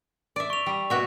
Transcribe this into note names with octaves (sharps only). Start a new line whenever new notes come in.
D5 E5
C#6 F7
G3
B2 F#4 E5